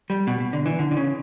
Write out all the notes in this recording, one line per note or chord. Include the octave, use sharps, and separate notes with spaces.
G3
B2
B2
D3
E3
D3
D3
C#3